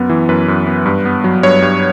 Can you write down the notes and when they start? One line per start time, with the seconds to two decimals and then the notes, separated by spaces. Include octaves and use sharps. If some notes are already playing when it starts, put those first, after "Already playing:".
Already playing: F#2 B3
0.09 E3
0.29 F#2 B4
0.48 F#2
0.67 B3
0.86 G2
1.05 B3
1.24 F#3
1.43 G2 C#5
1.62 G2